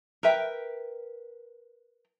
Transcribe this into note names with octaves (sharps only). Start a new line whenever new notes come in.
A#4 B4 E5 G5